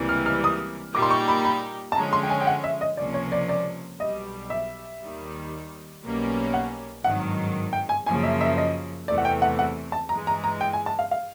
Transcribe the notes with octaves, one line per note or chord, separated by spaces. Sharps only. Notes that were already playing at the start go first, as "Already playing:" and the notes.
Already playing: C#2 C3 E3 G3 A#3
F6
F6
D#6
A#2 G3 A#3 D#4 G4 D6
C6
C#6
B5
B5
A5
D3 F3 G#3 C#4 A#5
C6
G5
G#5
G5
F#5
E5
D#5
C#2 C3 F3 A#3 C#4 D5
C#5
D5
D5
B1 B2 G3 D#5
E5
D#2 D#3 G3
B1 B2 G3 A#3 C#4
F#5
G#1 G2 D#3 F#3 F#5
G5
G#5
F#2 C#3 F3 A#3 G#5
E5
E5
D#5
E2 C3 E3 A3 D5
F#5
G5
F#5
F#5
A5
G2 E3 G#3 A#5
A#5
A#5
G5
G#5
A5
F5
F5